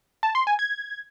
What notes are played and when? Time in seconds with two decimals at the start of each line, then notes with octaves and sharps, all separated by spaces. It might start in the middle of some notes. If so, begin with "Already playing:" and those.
0.23 A5
0.35 C6
0.47 G#5
0.59 G#6